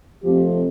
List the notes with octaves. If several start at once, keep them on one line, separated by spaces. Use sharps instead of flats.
F2 C3 F3 A3 G4